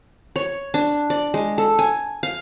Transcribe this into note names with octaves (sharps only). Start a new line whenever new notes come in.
C#5
D4
D5
G#3
A4
G#5
F5